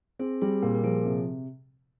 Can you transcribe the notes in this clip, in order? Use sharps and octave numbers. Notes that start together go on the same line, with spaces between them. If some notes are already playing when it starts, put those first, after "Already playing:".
C4 G#4
G3 G#4
A#2 A#4
A#4
F3 G#4
C3